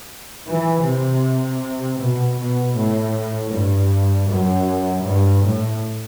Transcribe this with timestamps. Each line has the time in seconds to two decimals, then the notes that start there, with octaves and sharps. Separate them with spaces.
0.47 E3
0.84 C3
2.00 B2
2.38 B2
2.76 A2
3.53 G2
4.29 F#2
5.05 G2
5.44 A2